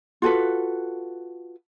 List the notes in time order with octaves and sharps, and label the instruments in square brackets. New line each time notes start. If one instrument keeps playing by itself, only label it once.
[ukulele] F4 F#4 A4 B4